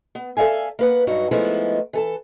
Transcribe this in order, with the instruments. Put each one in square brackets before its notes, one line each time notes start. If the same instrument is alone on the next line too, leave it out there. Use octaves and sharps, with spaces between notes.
[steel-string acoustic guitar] B3
A4 D5 E5 F5 G#5
A#3 B4 F#5
G2 F#3 D#4 F#4
F3 G#3 A3 B3 D#4 E4
E3 A4 A5